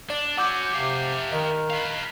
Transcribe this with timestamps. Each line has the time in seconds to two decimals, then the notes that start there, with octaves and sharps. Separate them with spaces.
0.10 D4 D5
0.37 F#3 C#4 F#5 D6 G6
0.72 C3 G4 F5
1.32 D#3 D#5
1.70 B4 F5